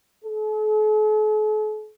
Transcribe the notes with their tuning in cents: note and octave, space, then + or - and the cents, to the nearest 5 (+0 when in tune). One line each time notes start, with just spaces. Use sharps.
A4 -45